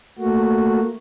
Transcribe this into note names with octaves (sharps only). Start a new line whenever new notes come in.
A3 A#3 F#4